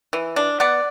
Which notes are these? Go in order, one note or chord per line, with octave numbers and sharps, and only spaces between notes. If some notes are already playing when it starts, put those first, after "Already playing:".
E3
D4
B3 D5 F#5